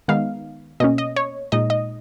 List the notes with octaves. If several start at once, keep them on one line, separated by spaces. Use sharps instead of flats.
D#3 G#3 B3 D#4 F5
B2 A#3 C#4 D#5
D#5
C#5
A#2 G#3 D#4 D#5
D#5